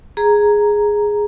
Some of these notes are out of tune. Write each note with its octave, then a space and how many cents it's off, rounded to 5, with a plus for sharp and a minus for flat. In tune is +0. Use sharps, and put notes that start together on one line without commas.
G#4 +0 A#5 +0